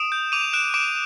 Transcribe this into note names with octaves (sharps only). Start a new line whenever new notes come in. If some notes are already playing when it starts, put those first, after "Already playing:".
Already playing: D#6 D7 E7
G6
D6 D#7 F7
F#6 D7 E7
D6 D7 E7